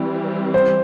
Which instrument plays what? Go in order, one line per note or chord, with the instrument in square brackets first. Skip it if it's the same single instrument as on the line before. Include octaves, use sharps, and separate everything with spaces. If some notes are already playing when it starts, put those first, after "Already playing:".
Already playing: [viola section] E3 G3 C4
[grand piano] C5